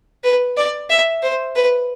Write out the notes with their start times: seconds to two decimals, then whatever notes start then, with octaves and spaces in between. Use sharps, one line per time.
0.24 B4
0.57 D5
0.90 E5
1.23 C5
1.56 B4